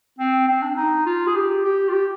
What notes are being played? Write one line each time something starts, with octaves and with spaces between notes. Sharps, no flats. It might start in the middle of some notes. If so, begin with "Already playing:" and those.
C4
C4
D4
D#4
F4
G#4
G4
G4
F4
G4